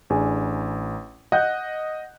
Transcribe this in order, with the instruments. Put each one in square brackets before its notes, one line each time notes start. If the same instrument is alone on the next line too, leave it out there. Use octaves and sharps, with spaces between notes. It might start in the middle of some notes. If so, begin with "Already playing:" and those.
[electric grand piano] A1 [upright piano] D4 G#4 G#5
[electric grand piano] D#5 [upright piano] F#5 F#6 G6